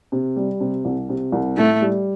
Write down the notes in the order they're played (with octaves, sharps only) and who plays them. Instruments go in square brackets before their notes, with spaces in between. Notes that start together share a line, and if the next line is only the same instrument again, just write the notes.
[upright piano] C3
G3
C3
C2
C3
C2
[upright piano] A2 [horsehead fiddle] A3
[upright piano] G3